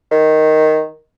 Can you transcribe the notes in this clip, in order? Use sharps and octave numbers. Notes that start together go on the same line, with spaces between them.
D#3